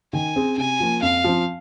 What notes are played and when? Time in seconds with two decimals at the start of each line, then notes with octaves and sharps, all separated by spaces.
0.13 D#3 G#5
0.36 C4 G#4
0.57 C3 G#5
0.80 F3 A#3
1.02 F2 F5
1.24 F3 C4